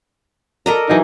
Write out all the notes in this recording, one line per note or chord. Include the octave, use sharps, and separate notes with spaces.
A4 A#4 D5 D#5 A#5
E3 F#3 D#4